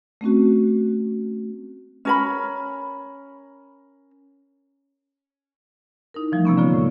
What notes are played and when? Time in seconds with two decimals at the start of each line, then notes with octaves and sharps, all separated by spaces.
0.21 A3 C4 C#4 F#4
2.05 C#4 A#4 B5
6.14 D#4 E4 A#4
6.32 E3 F3 G3 A3
6.45 C3 A#3 B3 C#4
6.57 D3 A#3 B3 F4 C#5
6.74 A2 C#6